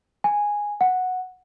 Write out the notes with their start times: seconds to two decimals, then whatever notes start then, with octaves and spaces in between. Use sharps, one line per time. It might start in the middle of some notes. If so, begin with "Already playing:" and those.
0.24 G#5
0.81 F#5